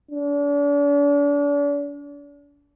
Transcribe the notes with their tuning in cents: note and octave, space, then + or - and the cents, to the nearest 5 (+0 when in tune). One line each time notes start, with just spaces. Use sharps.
D4 -40